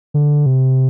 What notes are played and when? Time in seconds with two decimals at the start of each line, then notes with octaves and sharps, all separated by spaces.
0.14 D3
0.46 C3